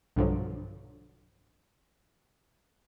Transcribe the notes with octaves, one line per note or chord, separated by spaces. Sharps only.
B1 G2 D3 F3 F#3